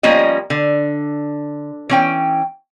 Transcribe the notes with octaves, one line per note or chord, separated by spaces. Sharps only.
F3 G3 A#3 C#4 D#5
D3
E3 C#4 G5